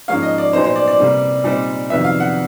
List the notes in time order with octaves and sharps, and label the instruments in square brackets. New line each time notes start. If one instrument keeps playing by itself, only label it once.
[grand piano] G#2 F3 A#3 C#4 F5
D#5
D5
A#2 F#3 B3 D#4 C5
C5
D5
D5
C3 E3 G3 A#3
A#2 G3 C4 D#4
F2 C3 D#3 F#3 B3 E5
F5
F#5